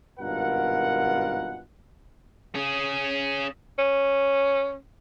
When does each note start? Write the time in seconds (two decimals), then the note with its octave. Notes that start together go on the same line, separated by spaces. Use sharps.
0.20 G#1 G2 B2 F4 A#4 F#5
2.55 C#4 G#4
3.78 C#4